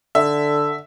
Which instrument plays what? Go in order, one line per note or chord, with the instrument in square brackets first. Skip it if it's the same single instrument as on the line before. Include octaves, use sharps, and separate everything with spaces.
[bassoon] D3 [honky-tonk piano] E5